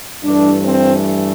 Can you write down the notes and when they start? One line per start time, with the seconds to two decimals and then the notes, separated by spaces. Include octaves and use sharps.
0.24 G2 E3 A3 D4
0.64 C4